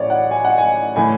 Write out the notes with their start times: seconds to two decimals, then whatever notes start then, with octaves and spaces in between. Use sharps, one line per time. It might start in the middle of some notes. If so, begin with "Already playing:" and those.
Already playing: A1 A2 E3 C#5 D5
0.10 F#5
0.31 G#5
0.45 F#5
0.58 G#5
0.96 A2 E3 G#5